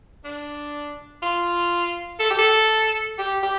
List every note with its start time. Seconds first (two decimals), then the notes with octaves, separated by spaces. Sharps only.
0.24 D4
1.23 F4
2.20 A4
2.30 G4
2.39 A4
3.19 G4
3.43 G4